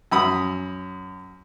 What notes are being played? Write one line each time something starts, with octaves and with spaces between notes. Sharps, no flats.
F#2 B5 D#6